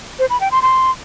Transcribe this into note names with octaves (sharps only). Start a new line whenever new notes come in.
C5
B5
G5
C6
C6